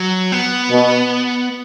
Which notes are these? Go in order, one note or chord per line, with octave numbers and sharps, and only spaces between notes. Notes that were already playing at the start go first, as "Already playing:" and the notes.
Already playing: F#3
B3
B2